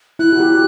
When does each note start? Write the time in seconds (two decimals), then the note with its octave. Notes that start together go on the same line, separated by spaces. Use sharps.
0.19 E4 F#6
0.33 F#4
0.40 G4